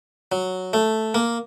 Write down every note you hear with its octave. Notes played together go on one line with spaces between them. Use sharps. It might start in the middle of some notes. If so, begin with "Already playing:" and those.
F#3
A3
A#3